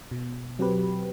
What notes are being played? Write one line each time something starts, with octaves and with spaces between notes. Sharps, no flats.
B2
F#3 C4 G4 B4